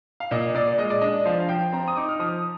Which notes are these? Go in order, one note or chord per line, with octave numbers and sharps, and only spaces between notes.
F5
A#2 D#5
A#2 D5
G#3 D#5
D5
D4 D#5
F3 F5
F5
F3 G5
C4 A#5
D#6
D#4 D6
F6
F3 D#6